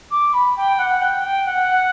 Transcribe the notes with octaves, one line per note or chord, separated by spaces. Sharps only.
D6
B5
G5
F#5
G5
G5
F#5